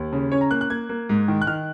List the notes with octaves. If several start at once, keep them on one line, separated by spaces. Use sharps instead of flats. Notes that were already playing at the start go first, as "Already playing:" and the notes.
Already playing: D#2
C#3
C#4 C#5
A#5
A#3 F#6
F#6
A#3 G#6
A#3
G#2
D#3
F#6
D#3 F6